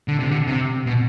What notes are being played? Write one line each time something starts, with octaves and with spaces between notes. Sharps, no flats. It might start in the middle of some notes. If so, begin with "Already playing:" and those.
D3
C3
D3
C3
B2